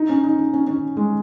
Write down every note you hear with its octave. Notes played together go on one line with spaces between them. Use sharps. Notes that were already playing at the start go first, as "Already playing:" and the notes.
Already playing: D#4
C#4
D#4
C#4
C#4
C#4
G#3